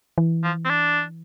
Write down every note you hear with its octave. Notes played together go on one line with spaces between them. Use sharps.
E3
F3
C4
D4